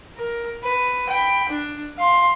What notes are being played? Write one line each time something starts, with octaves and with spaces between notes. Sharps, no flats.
A#4
B4
G5 B5
D4
F5 C6